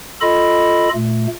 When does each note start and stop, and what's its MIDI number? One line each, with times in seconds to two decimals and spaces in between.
0.21 0.89 65
0.21 0.89 69
0.21 0.89 75
0.21 0.89 83
0.94 1.27 46
0.94 1.27 57